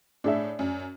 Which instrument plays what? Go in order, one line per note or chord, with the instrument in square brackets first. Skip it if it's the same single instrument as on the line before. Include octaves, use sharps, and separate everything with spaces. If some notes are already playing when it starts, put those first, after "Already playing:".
[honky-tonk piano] A2 [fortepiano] D4 G#4 E5
[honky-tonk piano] F#2